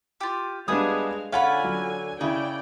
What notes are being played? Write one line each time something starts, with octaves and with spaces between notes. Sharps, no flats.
F4 G4
G3 G#3 B3 D4 G#4 F5 D#6
D3 C#4 F4 F5 F#5 G#5 B5
F#3
C#3 E4 G#4 D5 G5